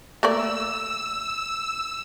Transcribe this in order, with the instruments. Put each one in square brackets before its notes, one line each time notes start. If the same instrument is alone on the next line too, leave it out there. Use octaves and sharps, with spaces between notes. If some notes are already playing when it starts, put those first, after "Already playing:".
[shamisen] A3 A#3 D5 [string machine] E6